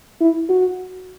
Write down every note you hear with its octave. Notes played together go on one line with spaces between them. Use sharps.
E4
F#4